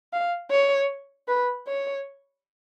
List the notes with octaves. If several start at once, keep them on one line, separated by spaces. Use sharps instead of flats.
F5
C#5
B4
C#5